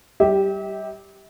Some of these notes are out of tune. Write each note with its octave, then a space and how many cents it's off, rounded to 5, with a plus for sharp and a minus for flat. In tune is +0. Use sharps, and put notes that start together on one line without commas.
G3 -20 G4 +0 E5 -40